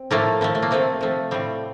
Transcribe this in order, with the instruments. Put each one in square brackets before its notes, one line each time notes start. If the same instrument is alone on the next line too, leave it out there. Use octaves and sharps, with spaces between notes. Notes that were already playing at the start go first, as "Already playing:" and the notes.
Already playing: [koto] C4
A2 F3 A3 A#3
A2 F3 A3
A3
A#3
C3 F3 A3 C4
C3 F3 A3
A2 G3 C4